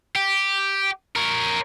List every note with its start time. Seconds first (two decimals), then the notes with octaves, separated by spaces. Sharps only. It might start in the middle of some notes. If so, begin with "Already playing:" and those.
0.15 G4
1.16 A#4 C#5